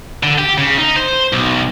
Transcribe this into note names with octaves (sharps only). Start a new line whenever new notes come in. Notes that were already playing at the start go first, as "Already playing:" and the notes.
D3
G4
C#3
D#4
C5
B1